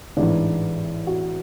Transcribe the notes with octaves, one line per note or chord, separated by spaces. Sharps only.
A1 G#2 E3 D4
F#4